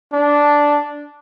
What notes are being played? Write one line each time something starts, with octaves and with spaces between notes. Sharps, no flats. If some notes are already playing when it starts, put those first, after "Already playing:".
D4